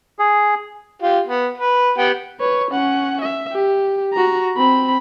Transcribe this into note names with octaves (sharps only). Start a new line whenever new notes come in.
G#4
F4 G4
B3
B4
B3 G4 G5
B4 C#5
C#4 F#5
E5
G4
F#4 A#5
C4 B5